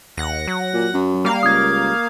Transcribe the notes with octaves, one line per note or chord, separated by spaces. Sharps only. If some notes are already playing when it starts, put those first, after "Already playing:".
D#2 F#5 A#6
F#3
A#2
F#2
G3 A#3 F5
C#2 D#6 G#6